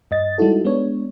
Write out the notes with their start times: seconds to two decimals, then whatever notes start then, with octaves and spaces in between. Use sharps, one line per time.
0.11 G2 D#5 A6
0.38 G3 G#3 D#4 E4 F#4 A4
0.65 G#3 B3 D4 C#5